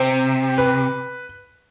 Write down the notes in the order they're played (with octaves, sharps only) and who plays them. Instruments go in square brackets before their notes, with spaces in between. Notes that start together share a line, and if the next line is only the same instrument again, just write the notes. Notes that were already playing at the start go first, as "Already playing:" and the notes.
Already playing: [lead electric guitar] C3 [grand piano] C5
[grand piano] B4